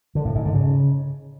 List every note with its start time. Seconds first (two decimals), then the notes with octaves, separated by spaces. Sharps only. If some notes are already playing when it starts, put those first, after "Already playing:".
0.15 D3
0.25 A2
0.35 G#2
0.45 D3
0.55 C#3